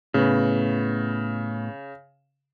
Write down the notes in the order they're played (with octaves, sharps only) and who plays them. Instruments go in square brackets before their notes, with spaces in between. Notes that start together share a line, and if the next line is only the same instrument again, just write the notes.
[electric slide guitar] A2 B3 [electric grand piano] C#3